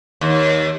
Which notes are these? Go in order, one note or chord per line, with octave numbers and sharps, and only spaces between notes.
D#2